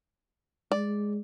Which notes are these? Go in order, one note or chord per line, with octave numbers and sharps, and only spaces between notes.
G#3 D5